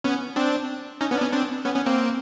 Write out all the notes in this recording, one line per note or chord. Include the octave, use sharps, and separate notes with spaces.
B3 C#4
C4 D4
C#4 D#4
B3 C#4
D4
B3 C#4
C4 D4
B3 C#4
B3 C#4
A#3 C4